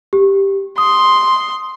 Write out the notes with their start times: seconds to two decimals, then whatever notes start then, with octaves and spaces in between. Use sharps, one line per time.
0.13 G4
0.78 C6 D#6